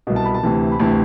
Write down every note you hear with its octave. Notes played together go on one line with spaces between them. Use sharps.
C2 B2
A5
B5
A5
D2 C3 E3
B5
D2 C3 E3 A5